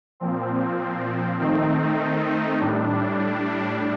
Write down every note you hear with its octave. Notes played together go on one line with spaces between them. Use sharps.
A#2 F3 C4
D#3 A3 C4 D#4
A2 G3 D4